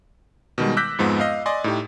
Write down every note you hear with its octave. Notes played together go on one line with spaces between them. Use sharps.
B2 D#3 G3 G#3
D6 E6 F#6 G6 A#6 B6
F2 G#2 F3 G#3 B3
D#5 F5
D5 D#5 G#5 C6
A2 D#4 G4